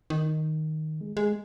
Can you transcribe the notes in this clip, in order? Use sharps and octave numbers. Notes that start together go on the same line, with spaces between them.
D#3
G#3
G#3